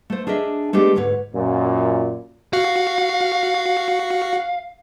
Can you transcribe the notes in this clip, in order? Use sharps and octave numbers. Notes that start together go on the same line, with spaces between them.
A3 C5
D4 G#4 A#4 D#5 E5
G#3 A3 B3 D4 G4 G#4
D2 G#2 B4 C#5
F#2 A#2
F#4 F5